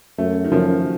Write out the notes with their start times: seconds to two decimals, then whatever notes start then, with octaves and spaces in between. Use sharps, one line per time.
0.18 F#2 A3
0.44 D#3
0.51 F#2 F3